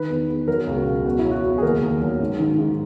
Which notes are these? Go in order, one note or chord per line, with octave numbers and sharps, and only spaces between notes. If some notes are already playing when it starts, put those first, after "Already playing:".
Already playing: D#3 B4
E2
E2
F#3 A#4
C#2
F#4
B2
E2 F#4
F#3 E4
F#4
E2
G#4
D#2 A#4
D#2
F#3
G#2
D#3
G#2